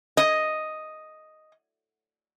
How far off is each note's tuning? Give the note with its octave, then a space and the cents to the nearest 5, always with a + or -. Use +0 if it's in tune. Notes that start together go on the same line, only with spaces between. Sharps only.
D#5 +0